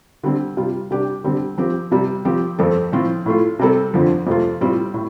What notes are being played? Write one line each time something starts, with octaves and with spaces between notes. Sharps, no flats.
D3 G3 C4
C3 G3 F4
C3 G3 D4 G4
D3 G3 C4
F3 C4 G4
C3 G3 C4
F3 C4 G4
F2 F3 C4 A4
A2 F3 C4 F4
A2 A3 F4
C3 G3 C4 A4
F2 D3 F3
F2 C3 A3 F4
A2 G3 C4 F4
A2